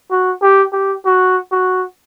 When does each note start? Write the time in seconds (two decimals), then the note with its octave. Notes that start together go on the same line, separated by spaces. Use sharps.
0.11 F#4
0.42 G4
0.73 G4
1.05 F#4
1.52 F#4